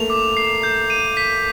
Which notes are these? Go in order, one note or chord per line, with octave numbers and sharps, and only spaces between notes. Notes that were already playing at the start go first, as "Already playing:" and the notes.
Already playing: A3 A#3 F7
D6
C7
G6
D#7
B6